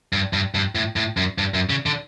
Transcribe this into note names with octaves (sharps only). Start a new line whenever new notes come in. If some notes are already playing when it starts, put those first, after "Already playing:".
G2
G2
G2
A2
A2
F#2
G2
F#2
C#3
D3